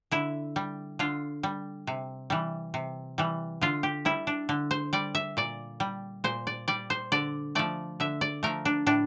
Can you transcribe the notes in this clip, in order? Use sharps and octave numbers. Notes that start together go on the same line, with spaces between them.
D3 E4
G3
D3 F4
G3
C3
E3 G3
C3
E3 G3
D3 F4
G4
G3 E4
D4
D3
C5
G3 D5
E5
A#2 D5
G3
A#2 C5
D5
G3 D5
C5
D3 D5
F3 A3 D5
D3 E5
D5
F3 A3 A#4
D4
A2 D4